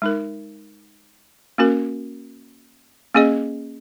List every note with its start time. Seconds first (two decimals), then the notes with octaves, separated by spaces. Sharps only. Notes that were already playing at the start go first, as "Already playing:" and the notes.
0.02 G#3 D#4 A#4
1.58 A#3 C#4 F#4 A#4
3.14 A#3 C#4 G#4 D#5